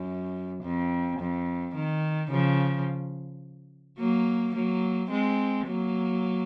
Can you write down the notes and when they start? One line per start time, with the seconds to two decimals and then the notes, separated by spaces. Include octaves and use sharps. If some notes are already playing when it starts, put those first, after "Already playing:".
Already playing: F#2
0.63 F2
1.20 F2
1.75 D#3
2.31 C#3 F3
3.98 F#3 A#3
4.55 F#3 A#3
5.10 G#3 C4
5.67 F#3 A#3